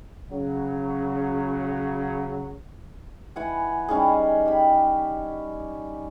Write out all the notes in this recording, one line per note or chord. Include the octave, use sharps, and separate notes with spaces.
C#3 F#3
E3 F#5 G#5
G3 C#4 D#4 G#4
G4 B5